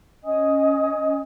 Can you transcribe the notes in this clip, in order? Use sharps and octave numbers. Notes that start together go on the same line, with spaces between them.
C#4 D#5 G#5 D#6